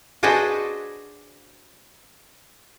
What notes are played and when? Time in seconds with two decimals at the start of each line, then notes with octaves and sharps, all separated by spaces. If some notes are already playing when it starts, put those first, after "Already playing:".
0.23 D4 F#4 G#4 B4 C5 D#5